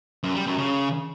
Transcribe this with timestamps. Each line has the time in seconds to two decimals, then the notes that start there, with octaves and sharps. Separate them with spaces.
0.23 F#2
0.35 G3
0.47 F#2
0.58 C#3